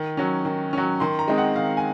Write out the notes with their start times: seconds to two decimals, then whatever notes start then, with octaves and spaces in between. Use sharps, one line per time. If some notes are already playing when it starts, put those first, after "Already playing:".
Already playing: D#3
0.17 F#3 C#4
0.45 D#3
0.73 F#3 C#4
1.00 D#3 C6
1.19 A#5
1.28 G#3 C4 D#4
1.38 F#5
1.56 D#3 F5
1.77 G#5